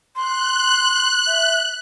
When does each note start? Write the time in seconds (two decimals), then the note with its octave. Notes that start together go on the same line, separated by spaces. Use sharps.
0.16 C6 F#6
1.27 E5